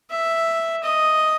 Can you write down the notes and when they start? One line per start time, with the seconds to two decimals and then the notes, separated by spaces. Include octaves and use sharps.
0.10 E5
0.83 D#5